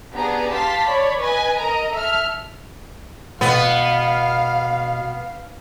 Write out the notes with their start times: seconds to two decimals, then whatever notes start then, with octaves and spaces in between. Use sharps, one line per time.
0.15 B3 D4 G4 G#4 A#5
0.50 G4 F5 A5 C6 B6
0.85 C#5 D5 B5
1.19 B4 D#5 G#5
1.58 A#4 D#5 A#5
1.92 A4 E5 F6
3.41 B2 B3 F5